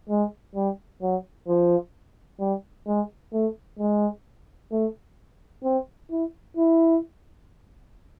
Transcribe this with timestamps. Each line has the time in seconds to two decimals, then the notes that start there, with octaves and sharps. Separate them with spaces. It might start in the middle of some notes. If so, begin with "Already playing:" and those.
0.10 G#3
0.55 G3
1.02 F#3
1.48 F3
2.40 G3
2.87 G#3
3.33 A3
3.79 G#3
4.72 A3
5.64 C4
6.11 E4
6.57 E4